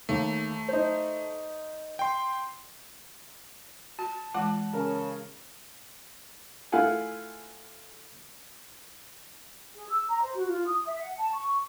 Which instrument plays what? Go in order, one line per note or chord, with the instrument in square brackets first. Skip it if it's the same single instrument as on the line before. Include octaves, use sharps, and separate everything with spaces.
[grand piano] D#2 [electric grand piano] A3
[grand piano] D#4 C5
[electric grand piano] G5 C6
[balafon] F#4 [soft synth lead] A5
[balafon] E3 G#3 F4 [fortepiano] F#5
[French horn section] C#3 [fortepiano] A#4
[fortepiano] A3 E4 F4 F5 F#5 G#5
[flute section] G#4
E6
A#5
C5
F#4
F4
D#6
E5
F#5
A5
C#6